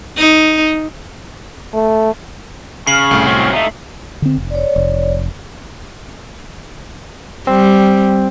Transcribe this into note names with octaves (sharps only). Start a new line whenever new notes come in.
D#4
A3
C#3 C#6 F6 C7 F#7
C2 A2
F#3 C4 C#4
A3 D#4 E5 F5
D3 C4
F1
C#5 D5
F1
G3 C4